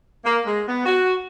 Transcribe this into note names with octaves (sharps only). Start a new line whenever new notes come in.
A#3
G#3
B3
F#4